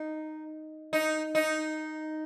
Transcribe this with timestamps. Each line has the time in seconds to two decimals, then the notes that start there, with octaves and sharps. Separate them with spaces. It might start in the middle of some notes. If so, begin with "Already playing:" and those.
Already playing: D#4
0.93 D#4
1.35 D#4